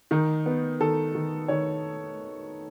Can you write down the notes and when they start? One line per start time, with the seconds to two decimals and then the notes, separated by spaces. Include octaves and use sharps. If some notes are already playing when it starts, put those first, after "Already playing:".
0.11 D#3 D#4
0.46 B3
0.80 D#3 A4
1.15 D#3
1.48 D#3 C#5